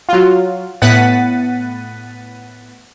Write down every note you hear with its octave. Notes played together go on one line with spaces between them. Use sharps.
F#3 F4
A2 B3 F#5 A6 B6 D#7